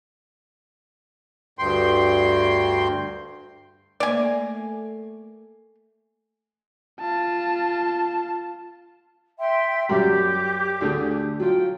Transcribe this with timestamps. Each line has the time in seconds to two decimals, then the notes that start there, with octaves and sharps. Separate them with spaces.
1.59 D2 G2 G5 C6
4.00 A3 A#3 D5 G#5
7.00 F4 A5
9.39 E5 G5 C6
9.89 F#2 G3 G4 D6 G6
10.81 D2 D3 G#4
11.40 F#3 F4 G5